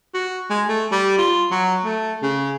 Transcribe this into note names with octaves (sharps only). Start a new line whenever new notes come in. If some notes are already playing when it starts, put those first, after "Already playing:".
F#4
G#3
A3
G3
F4
F#3
A3
C#3